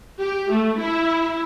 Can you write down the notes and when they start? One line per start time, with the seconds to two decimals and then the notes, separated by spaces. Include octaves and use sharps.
0.21 G4
0.50 A3
0.79 E4